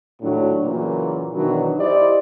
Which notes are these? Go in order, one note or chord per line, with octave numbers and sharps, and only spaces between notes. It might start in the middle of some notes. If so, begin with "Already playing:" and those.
D#2 A2 F#3 D4
A#2 C#3 E3 F#3 A#3
B2 D#3 E3 F#3 D4 A#4
E4 G4 C5 D5 D#5